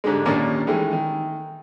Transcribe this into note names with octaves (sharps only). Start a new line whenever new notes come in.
G#2 D3 G3 G#3
D#2 A#2 A#3 C#4 D4
D#3 E3 G#3 A3
D#3